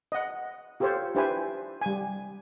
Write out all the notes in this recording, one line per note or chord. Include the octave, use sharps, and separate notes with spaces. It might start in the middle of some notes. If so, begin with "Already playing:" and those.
D#5 F#5
F4 G4 A4 C5 C#5
D4 E4 G4 B4 C5 G#5
G3 G#5